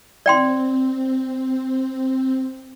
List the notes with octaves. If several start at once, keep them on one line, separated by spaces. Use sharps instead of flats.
C4 D5 G5 C6